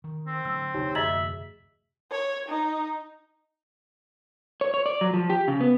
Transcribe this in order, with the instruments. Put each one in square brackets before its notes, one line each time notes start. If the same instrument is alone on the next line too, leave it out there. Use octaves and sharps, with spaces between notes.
[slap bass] D#3
[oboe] C4
[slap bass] D3 F#3 A3 [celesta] E6
[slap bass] F1 D2 [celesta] D#4 G4 C#5
[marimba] F#2 G#4 [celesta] D#5 F#7 [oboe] E5
[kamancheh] C#5
D#4
[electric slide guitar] C#5
C#5
D5
F#3
F3
G4
C#3
B3